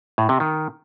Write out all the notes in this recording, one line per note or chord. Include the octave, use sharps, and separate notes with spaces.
A2
C3
D#3